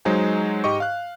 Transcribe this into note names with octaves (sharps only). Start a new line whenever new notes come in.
F#3 G#3 D#4 C5 G#5
G#2 G4 D#5 C#6
F5 F#6